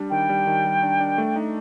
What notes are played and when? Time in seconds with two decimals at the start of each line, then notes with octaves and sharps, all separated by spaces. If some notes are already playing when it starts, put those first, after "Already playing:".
Already playing: G3 D4
0.10 D#3 G5
0.29 G3
0.47 D#3
0.65 G3
0.83 D4
1.00 D4
1.18 A3
1.36 D#4